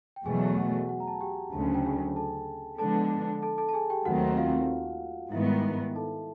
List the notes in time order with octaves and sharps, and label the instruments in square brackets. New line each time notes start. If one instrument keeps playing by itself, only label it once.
[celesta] G5
[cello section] E2 B2 F#3 A3 [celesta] G#4 G#5
[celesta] F#4 F#5
F#4 F#5
A#5
A5
G#5
G4 G5
[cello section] D2 C#3 F#3 [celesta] A5
[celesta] G#5
G5
G#4 G#5
A4 A5
[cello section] D3 F3 G#3 B3 D4 [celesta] A4 A5
[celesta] A4 A5
A4 A5
A5
G#4 G#5
G4 G5
[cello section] D#2 D#3 F#3 A3 C4 [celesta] F#4 F#5
[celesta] F4 F5
[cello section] G#2 D#3 G3 B3 [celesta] E4 E5
[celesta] A4 A5